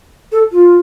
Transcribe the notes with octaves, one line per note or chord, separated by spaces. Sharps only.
A4
F4